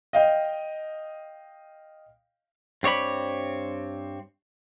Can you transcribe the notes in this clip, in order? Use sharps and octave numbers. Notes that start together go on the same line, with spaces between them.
D#5 F5 G5
G2 C4 C#5 D5 B5